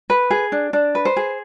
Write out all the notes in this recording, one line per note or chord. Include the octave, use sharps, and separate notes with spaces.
B4
G#4
D4
D4
B4
C5
G#4